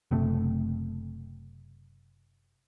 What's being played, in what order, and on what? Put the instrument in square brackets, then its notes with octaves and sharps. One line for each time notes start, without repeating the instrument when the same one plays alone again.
[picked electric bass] F#1 C3 A3